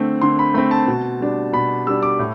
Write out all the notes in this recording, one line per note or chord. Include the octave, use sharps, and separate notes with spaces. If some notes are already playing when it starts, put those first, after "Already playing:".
Already playing: D3 A3 C4
D3 C6
B5
A3 C4 B5
A5
B2
G3 D4
B2 B5
G3 D4 E6
D6
A2